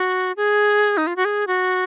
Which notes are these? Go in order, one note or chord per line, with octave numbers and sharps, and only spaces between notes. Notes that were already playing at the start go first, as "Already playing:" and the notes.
Already playing: F#4
G#4
D#4
F4
F#4
G#4
F#4